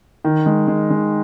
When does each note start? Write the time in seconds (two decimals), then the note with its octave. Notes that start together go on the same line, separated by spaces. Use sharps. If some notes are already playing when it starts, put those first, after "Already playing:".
0.25 D#3
0.46 G#3
0.67 G#3
0.90 G#3